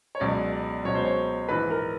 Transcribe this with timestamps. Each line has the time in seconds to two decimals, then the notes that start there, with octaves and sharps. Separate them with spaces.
0.15 C#5
0.20 C#2 B2 F#3 D5
0.53 D5
0.85 C#2 B2 F#3 C#5
0.95 C5
1.05 C#5
1.49 A#1 G#2 E3 B4
1.70 A#4